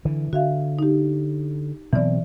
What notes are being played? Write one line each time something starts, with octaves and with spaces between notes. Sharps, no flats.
D3 E3
D3 F#4 E5 F5
D#4 G4
B2 E3 F#3 C4 D5